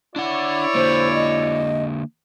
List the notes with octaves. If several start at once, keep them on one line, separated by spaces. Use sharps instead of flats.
D4 E4 C#5 D5 F#5
D3 A#3 C5
D#5